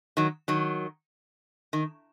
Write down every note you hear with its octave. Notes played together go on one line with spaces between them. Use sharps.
D#3 F#3
D#3 F#3
D#3